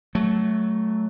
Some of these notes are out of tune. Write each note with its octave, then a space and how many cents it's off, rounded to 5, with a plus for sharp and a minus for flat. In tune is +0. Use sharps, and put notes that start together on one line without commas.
F#3 +15 A3 -10